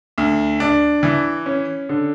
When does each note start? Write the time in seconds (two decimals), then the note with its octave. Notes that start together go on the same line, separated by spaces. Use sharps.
0.18 D2
0.60 D4
1.03 E3
1.46 C#4
1.89 D3